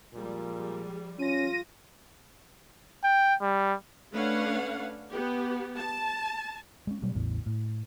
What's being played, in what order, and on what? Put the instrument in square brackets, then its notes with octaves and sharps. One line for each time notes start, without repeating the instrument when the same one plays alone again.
[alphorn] A#2 [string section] F3 G3 G#3
[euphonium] C#4 [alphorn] F4 [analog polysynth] A#6 D#7
[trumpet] G5
G3
[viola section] A3 C#4 D4 B4 F5 F#5
B3 G4
A5
[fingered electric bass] G#3 C#4
B2 F#3 G3 A3
A1 E2 A2 C#3
A2